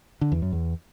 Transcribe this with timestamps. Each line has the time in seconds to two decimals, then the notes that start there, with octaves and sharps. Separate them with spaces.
0.21 D3
0.32 E2
0.42 F#2
0.52 E2